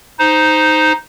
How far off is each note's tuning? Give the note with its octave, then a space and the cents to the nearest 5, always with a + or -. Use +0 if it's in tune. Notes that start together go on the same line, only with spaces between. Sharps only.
D#4 +0 C5 -10